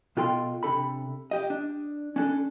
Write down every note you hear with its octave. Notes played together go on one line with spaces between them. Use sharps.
B2 F4 A4 G5 C6
C3 D4 A4 B5
G4 D#5
D4
C#4 D4 A4